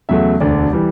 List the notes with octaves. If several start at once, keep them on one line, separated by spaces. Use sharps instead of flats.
E2 C#3 F#3 A3 E5
E1 D2 D3 D5
E3 G3